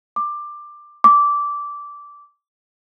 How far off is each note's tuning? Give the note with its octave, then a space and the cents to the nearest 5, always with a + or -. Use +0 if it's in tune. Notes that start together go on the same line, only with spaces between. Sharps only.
D6 +15
D6 -15